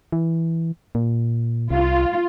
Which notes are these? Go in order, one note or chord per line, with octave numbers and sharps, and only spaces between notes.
E3
A#2
C2 F4